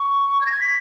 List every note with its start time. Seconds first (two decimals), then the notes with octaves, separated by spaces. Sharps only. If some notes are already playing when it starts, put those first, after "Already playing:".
Already playing: C#6
0.41 G#6
0.46 A#6
0.52 G#6
0.61 B6